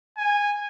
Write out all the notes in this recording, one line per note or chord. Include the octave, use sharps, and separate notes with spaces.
G#5